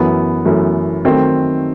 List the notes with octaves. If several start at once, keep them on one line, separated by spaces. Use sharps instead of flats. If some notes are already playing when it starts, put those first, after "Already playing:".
Already playing: F#2 E3 A3 B3
F#2 E3 A3
D#3 F#3 A3 C4